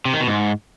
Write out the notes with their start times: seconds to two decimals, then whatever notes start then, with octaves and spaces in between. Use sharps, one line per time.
0.05 C3
0.13 D#3
0.20 B2
0.28 G#2